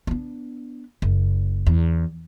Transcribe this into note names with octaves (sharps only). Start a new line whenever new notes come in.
B3 D4
F#1
E2